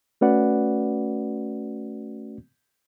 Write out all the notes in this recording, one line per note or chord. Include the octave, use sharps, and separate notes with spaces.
A3 C#4 F#4 B4 D5 F#5